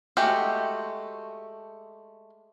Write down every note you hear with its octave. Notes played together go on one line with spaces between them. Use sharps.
G#3 A3 F#4 G4